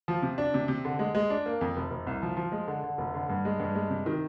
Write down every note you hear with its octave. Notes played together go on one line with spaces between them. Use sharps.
F3
C3
D4
C3
C3
D3
G#3
G#3
D4
A#3
F2
F1
F1
C2
F3
F3
G#3
D3
D3
F1
D3
G2
G#3
G2
G#3
C3
D#3